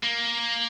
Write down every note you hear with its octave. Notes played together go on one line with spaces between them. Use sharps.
A#3